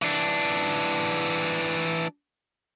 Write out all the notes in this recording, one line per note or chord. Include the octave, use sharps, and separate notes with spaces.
E3 D4